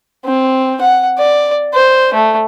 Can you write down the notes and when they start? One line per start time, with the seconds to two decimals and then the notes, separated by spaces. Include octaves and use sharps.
0.25 C4
0.81 F#5
1.18 D5
1.74 C5
2.14 A3